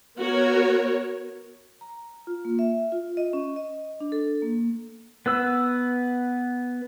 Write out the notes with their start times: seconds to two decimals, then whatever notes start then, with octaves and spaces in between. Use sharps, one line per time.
0.18 B3 F#4 A#4 C#5
1.81 A#5
2.27 F4
2.45 A#3
2.59 E5
2.92 F4
3.17 D#5
3.33 C#4
3.56 D#5
4.01 D4
4.12 A4
4.42 A#3
5.26 B3 B4 E6